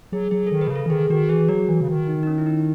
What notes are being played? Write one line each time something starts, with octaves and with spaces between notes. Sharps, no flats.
F#3 G#4
F#3 G#4
D#3 A4
B4
B2
C#3
A4
E3
D#3 G#4
D#3 F#4
E3 G#4
F#3 F#4
E3
C#3
D#3
D#4
D#4
C#4
E4
D#4